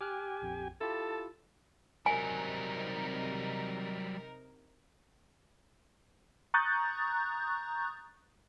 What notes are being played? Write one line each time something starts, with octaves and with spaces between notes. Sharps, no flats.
G4 G#5 D6 F6 F#6
A#1 F2
E4 F4 G4 A4 A5
C3 F#3 G3 D#4 A#4 G#5
A#5 C#6 D#6 F#6 G6 A6